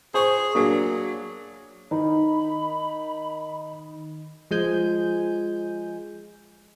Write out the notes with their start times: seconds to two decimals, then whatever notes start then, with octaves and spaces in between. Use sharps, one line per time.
0.14 G#4 C5 C#6
0.55 F#3 A#3 D4 G#4
1.91 D#3 D#4 B5
4.51 F3 G#3 G#5 G6